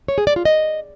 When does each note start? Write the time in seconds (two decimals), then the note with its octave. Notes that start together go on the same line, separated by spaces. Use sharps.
0.08 C#5
0.18 G#4
0.27 D5
0.36 F4
0.45 D#5